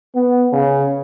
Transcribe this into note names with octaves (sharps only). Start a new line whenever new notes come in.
B3
C#3